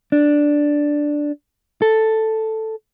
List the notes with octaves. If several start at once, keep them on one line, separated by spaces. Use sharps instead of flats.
D4
A4